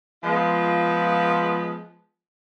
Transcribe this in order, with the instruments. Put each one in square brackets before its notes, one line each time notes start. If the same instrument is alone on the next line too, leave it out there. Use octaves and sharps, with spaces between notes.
[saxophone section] F3 G#3 B3 F4